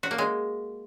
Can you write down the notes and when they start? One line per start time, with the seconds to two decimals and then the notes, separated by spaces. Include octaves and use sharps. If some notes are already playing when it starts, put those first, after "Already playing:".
0.03 F#4
0.11 A#3
0.18 G#3